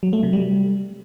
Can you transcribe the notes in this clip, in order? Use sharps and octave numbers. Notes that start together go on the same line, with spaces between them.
F#3
A3
C3
G3